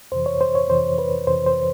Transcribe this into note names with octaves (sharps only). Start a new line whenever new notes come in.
F2 C3 E3 C5
C#5
C5
C#5
F2 C3 E3 C5
B4
F2 C3 E3 C5
C5